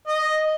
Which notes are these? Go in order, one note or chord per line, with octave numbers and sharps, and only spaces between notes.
D#5